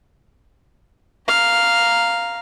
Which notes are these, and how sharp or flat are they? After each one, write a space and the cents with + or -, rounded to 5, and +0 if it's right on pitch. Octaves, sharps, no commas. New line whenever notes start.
F5 +0 A#5 +0